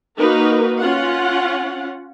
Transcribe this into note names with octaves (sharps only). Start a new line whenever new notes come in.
A#3 D#4 F#4 A#4 B4
C#4 F4 F#5